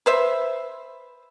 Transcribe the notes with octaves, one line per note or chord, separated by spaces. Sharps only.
B4 C5 E5